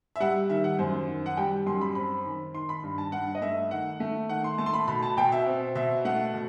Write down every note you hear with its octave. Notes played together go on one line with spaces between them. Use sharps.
E5
G3 F#5
D#3 E5
F#5
F#2 C5
D#3
F#5
G3 G5
F#2 C6
B5
C4 B5
D#3
D#3 C6
B5
G2
A5
G2 F#5
D#5
A3 E5
D#3 F#5
A3
D#3 F#5
C6
A3 A5
C6
B5
B2 B5
A5
B2 G5
E5
C4
B2 E5
A3 F#5
B2